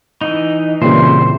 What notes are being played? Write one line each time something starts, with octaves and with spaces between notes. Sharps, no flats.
E3 D#4
A#2 C#3 E3 G3 C4 C5